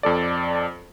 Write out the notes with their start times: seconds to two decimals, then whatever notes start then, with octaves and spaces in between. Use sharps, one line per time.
0.03 F2 A4 D5